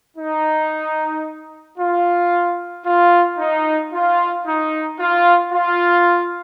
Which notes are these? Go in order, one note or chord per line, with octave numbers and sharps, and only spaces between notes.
D#4
F4
F4
D#4
F4
D#4
F4
F4